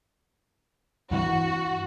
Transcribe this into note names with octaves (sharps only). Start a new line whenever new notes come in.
G2 E3 F#4